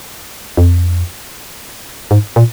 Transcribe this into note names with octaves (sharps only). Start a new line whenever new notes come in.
F2
G#2
A#2